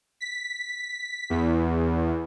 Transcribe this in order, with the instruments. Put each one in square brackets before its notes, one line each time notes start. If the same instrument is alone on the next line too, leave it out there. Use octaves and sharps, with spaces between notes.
[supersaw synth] B6
E2